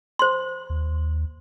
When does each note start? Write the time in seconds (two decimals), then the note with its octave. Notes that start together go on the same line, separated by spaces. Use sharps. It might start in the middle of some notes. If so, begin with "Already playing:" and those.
0.19 C5 C6
0.70 D#2